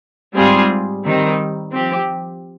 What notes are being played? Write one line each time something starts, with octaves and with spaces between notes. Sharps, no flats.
G#2 G3 C4 F4 G#4
D#3 G3 C4 D#4
F3 C4 G4